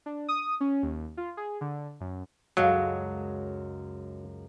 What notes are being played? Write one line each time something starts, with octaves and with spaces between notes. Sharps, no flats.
D4
D#6
C#4
D#2
F4
G#4
D3
F#2
C#2 F#2 F#3 G#3 A4 F5